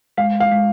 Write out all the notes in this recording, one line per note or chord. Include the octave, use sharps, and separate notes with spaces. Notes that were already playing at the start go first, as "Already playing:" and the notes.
G#3 F5
F5
G#3